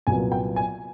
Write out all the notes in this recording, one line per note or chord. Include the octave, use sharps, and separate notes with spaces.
C2 A#2 F#3 B3 G#5
G5
G#5